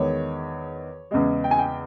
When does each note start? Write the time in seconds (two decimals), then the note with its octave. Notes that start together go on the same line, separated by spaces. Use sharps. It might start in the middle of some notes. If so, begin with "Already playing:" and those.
Already playing: E2 D#3 G#3 C#5
1.11 E2 C#3 G#3
1.44 G5
1.51 G#5
1.59 G5